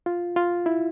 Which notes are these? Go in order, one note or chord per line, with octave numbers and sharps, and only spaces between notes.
F4
F4
E4